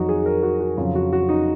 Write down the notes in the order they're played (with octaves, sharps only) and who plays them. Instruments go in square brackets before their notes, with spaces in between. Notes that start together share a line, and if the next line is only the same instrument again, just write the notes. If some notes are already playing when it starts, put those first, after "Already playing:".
Already playing: [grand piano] F2 D#3 F#3 D#4 F#4
G#4
A#4
F#4
F#4
F2 C#3 F#3 F4
F#4
F#4
D#4